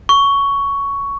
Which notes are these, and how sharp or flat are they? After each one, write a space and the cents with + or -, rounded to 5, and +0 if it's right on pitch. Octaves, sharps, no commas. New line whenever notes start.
C#6 +10